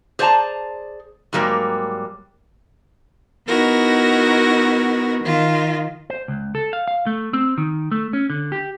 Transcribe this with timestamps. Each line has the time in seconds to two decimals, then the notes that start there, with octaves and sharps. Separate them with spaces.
0.19 G#4 C5 D5 G5 A5 A#5
1.33 G#2 F#3 G3 A#3 G5
3.45 B3 D#4 E4 F#4 A#4
5.23 D#3 F4
6.10 C5
6.28 C#2
6.55 A4
6.73 F5
6.88 F5
7.06 A3
7.33 C4
7.58 D#3
7.91 A3
8.13 C#4
8.30 D3
8.52 G4